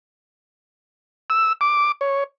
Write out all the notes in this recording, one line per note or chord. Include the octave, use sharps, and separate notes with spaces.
E6
D6
C#5